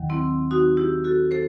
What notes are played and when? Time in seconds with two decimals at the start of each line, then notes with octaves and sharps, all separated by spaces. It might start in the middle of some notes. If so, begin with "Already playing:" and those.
Already playing: D#2 D#3 F#3
0.10 C4 E4
0.51 D#4 F#4
0.77 E4 G4
1.04 F#4 A4
1.31 A4 C5